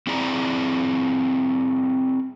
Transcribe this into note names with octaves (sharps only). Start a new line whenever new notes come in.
C4 E4 G#4 D5 A5 A#5